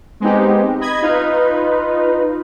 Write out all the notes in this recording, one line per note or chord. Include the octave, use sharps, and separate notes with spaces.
G#3 B3 C4 D#4 G4
D#5 B5 G#6
D#4 F4 B4